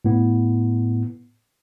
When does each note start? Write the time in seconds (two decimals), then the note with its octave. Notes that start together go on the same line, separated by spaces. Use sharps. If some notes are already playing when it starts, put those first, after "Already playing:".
0.05 A2 B3